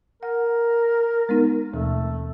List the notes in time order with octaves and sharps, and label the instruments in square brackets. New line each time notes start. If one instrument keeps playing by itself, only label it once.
[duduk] A#4 [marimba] F#5
[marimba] G#3 B3 D#4
[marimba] D#2 B2 E3 [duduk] A3